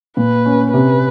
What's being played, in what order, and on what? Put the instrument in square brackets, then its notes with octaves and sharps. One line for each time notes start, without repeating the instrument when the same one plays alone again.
[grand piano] A#2 [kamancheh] B4
[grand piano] C#4
[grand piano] C3 [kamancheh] B4